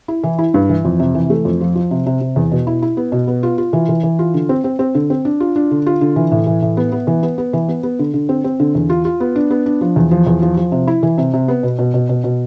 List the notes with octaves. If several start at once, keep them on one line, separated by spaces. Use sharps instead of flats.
E4
E3
E4
G2
E3
F2
C3
E3
A3
F2
F3
F3
C3
C3
C3
E2
B2
E4
E4
B3
B2
B3
F4
F4
E3
E3
E3
F4
D3
C4
C4
C4
D3
C4
D4
F4
D4
D3
F4
D3
E3
A2
E3
A2
B3
B3
E3
B3
B3
E3
B3
B3
D3
D3
C4
C4
D3
E2
F4
F4
B3
D4
B3
D4
F3
E2
F3
E2
F3
F3
C3
E4
E3
C3
C3
B3
B2
B2
B2
B2
B2